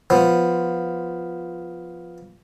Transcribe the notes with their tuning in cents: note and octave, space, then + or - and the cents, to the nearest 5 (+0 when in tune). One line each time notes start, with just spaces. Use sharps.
F3 +0 B3 +0